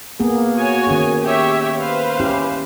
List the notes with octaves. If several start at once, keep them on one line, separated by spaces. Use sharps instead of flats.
A#3 B3 G#4
F#4 C#5 G#5
D#3 C#4 G#4
G4 C#5 E5
B4 C5 F5
C#4 E4 G4